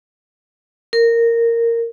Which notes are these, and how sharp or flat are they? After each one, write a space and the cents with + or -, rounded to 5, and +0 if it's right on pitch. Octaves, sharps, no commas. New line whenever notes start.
A#4 -10